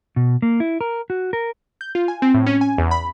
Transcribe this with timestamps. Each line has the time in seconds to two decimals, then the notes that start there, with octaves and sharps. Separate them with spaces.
0.16 B2
0.42 A#3
0.60 E4
0.81 A#4
1.10 F#4
1.33 A#4
1.81 G6
1.95 F4
2.08 G#5
2.22 C4
2.34 A2
2.46 C#4
2.61 G#5
2.78 E2
2.91 B5